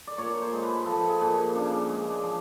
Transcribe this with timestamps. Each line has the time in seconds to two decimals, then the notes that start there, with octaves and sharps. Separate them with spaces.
0.07 D5
0.18 A#2 C#5
0.41 C5
0.53 G#3
0.63 B4
0.86 F3 A4
1.09 G#4
1.21 A#2
1.55 C#3 D4
1.89 G#3
2.24 F3